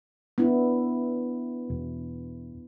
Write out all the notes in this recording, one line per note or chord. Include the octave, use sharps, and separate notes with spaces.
B3 D4 E4
E1